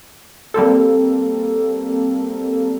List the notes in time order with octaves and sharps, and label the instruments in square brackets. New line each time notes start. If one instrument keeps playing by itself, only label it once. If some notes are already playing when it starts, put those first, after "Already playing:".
[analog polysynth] G3 A#3 C4 A4